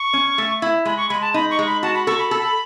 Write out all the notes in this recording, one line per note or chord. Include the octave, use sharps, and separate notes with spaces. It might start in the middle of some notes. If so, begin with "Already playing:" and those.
Already playing: C#6
C#4
A3
E4
G#3 B5
C#6
G#3 B5
A5
D#4 B5
C#6
G#3
B5
F#4 A5
B5
A4 C#6
B5
A4